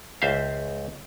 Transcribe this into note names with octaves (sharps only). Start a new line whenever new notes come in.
C#2 C5 E5 F5